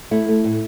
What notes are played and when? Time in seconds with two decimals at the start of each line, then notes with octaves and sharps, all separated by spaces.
0.11 A3 E4
0.29 A3
0.44 A2